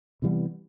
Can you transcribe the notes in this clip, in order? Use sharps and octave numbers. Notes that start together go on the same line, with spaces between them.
C3 E3 G3 B3